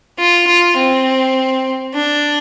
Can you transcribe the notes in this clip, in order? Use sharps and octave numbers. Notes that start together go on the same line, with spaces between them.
F4
F4
C4
D4